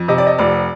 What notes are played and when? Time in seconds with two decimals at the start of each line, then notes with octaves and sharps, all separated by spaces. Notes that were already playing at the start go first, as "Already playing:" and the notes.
Already playing: F2
0.08 C3 D#5
0.18 D5
0.27 D#5
0.38 F1 D5